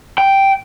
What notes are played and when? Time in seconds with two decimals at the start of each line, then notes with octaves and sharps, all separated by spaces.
0.18 G5